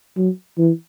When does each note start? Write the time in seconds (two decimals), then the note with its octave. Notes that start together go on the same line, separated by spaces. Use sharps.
0.17 F#3
0.58 E3